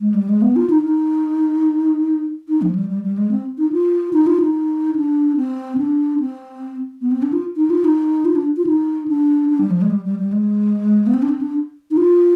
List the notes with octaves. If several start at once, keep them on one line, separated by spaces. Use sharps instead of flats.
G#3
G3
G#3
B3
F4
D#4
D#4
D#4
F3
G3
G3
G3
G#3
C4
D#4
F4
D#4
F4
D#4
D4
C4
D4
C4
B3
C4
D4
F4
D#4
F4
D#4
F4
D4
F4
D#4
D4
D4
G3
F3
G#3
G3
G3
G3
G#3
B3
C4
D4
C4
D4
D#4
F4